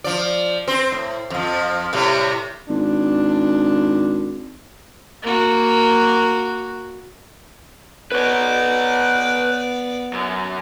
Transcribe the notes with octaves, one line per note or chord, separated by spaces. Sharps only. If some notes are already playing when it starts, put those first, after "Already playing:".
F3 D5
C4 C5
A2
F2 F3
A2 C3 G3
G#1 D4
A#3 F#4
B3 B4 C#5 D5
F#2